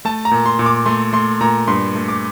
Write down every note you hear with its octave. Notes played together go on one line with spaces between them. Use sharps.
A3 A5
A#5
A#2
C6
A#2
D6
A3 C6
A3 C6
A#2 A#5
G2 C6
A3
D6